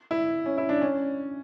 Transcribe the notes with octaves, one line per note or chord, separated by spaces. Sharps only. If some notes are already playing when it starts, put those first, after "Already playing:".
E4
C#4
E4
D4
C#4